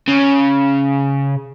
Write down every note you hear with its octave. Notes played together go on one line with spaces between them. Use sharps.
C#3